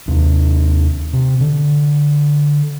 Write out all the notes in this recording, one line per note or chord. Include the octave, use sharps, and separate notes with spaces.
D#2 C3
C3
D3